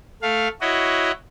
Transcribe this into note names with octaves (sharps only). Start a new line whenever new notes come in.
A3 F5
E4 F#4 C#5 D#5